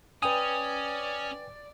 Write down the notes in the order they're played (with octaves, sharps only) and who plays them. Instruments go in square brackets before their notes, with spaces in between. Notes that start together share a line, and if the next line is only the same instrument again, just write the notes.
[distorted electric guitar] C#4 [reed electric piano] B4 G5 G#5 [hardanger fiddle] D5 [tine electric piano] D#6